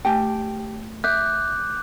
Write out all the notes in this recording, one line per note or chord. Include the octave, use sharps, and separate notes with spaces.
A3 G4 G5 G#5
E5 D6 F#6 G6